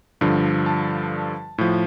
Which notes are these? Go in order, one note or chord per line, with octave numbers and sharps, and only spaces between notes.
G2 D3 F3
A5
A2 F3